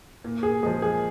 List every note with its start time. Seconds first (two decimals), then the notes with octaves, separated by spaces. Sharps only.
0.24 A#2
0.43 G#4
0.63 F3 G#3 G#4
0.82 G#4